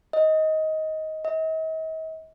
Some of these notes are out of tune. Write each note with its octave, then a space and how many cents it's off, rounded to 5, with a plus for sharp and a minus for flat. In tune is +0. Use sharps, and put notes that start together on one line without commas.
D#5 +15
D#5 +45